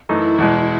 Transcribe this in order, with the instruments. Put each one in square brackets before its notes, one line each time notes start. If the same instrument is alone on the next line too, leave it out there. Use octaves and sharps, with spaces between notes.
[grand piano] F#2 E3 A3 D#4 [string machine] E4
[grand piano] E2 B2 G#3